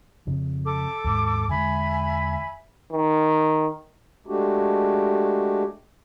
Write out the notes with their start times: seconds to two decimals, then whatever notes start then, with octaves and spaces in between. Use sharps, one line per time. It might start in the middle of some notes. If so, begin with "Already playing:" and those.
0.27 F2 C#3
0.65 A4 D6
1.04 D#2 G#2
1.48 E2 D3 G#3 E5 G#5 B5
2.92 D#3
4.27 G#3 A3 D4 F#4 G4